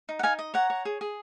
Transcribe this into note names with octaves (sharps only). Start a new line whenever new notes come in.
D#4
F#5
D#4 F5 G#5
D#5
C#5 F#5 A#5
C#5
G#4
G#4